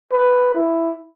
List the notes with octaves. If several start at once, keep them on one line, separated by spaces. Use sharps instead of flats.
B4
E4